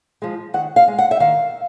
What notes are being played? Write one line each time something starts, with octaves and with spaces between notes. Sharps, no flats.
F3 G#3
D#3 F#5
F5
G#3
F#5
E5
D#3 F5